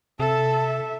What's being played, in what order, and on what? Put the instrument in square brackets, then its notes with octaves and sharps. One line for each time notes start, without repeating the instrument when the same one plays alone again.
[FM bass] C3 [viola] A4 [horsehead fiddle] E5 [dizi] A5